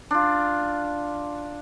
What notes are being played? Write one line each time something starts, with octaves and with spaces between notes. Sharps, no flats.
D4 F4